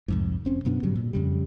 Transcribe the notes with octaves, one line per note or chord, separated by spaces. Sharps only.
C2 F2 G#2
F1 C4 C#4
F#2 B2 B3 D4
G#2 D3 F#3 G3
A#2
F2 C#3 G3